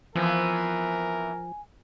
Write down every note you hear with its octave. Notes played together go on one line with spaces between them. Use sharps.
E3 F3 B3 C4 A#4 G#5